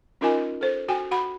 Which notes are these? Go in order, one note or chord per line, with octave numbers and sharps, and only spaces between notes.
C#4 D#4 F4 A#4 D#5 G#5
A4 C5
F#4 G5 G#5
F#4 F#5 B5